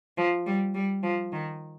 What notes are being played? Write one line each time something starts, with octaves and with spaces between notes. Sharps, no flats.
F3
G3
G3
F3
D#3